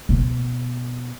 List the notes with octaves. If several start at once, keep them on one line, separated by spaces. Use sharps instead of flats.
B2